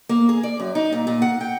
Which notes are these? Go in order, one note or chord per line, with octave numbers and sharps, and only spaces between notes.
A#3
G#4
D5
F#2
D#4
A#2
A#2
F#5
G5